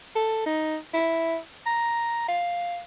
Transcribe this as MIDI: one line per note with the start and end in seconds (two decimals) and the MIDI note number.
0.16 0.42 69
0.46 0.77 63
0.93 1.37 64
1.66 2.27 82
2.28 2.81 77